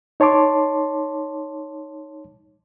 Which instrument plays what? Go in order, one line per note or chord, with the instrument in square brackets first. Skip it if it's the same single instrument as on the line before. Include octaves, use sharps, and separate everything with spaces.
[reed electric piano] D#4 C#5 A5 C6 D6